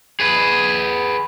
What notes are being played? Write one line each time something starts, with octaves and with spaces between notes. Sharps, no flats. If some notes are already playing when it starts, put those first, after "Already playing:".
G#4 B4